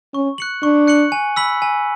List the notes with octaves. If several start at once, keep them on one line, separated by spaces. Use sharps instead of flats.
C#4 C#6
F#6 C#7 F#7
D4 C#6
F#6 C#7 F#7
G#5
B5 E6 B6 F#7
G#5